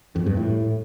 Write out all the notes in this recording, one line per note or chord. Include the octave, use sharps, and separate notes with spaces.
F2
G2
A2